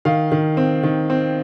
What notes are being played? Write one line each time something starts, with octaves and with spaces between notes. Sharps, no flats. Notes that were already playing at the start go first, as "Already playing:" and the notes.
D#3 F5
D#3
C4
D#3
C4